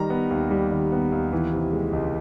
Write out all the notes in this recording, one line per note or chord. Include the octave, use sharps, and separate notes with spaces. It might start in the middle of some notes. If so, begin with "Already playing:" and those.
Already playing: D#3 G3 A#5
B3
D#2
G3
D#3
B3
D#2
E3
C3
G#3
C#2